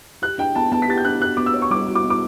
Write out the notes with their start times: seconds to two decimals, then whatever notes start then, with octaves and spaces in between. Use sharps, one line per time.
0.22 G4 F#6
0.38 D4 G5
0.55 B3 A5
0.72 B3 A5
0.82 B6
0.88 G4 A6
0.98 G6
1.05 D4 F#6
1.21 F#4 F#6
1.37 B3 D6
1.46 E6
1.54 C#5
1.62 C#6
1.70 G3 D6
1.88 F#4
1.95 D6
2.04 B3
2.10 D6